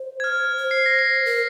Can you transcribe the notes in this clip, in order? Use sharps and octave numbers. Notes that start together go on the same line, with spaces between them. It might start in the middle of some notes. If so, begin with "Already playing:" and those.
Already playing: C5
G#6
F6
C5
C7
A#6
C7
A#4